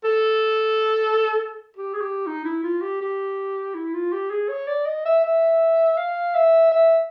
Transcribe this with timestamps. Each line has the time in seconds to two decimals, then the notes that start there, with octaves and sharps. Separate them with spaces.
0.04 A4
1.76 G4
1.94 G#4
2.01 G4
2.26 D#4
2.45 E4
2.63 F4
2.81 G4
3.01 G4
3.74 E4
3.94 F4
4.12 G4
4.30 G#4
4.49 C#5
4.67 D5
4.86 D#5
5.05 E5
5.24 E5
5.97 F5
6.35 E5
6.71 E5